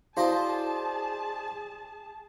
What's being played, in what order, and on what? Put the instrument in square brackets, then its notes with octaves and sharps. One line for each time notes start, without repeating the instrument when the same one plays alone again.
[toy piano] E4 F#4 F5 [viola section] G#4 A5 [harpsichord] C5 D5 D#5